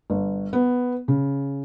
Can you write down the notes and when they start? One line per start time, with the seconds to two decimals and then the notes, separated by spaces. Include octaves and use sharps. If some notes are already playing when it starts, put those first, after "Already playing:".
0.10 G1
0.53 B3
1.08 C#3